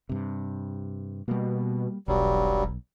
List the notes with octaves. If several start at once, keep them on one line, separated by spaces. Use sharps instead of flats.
G2 C3
B2 G3 A#3
E1 B1 G2 F#3 G3